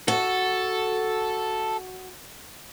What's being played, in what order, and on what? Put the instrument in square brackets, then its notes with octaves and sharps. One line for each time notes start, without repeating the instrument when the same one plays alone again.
[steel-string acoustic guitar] F#4 [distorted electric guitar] A4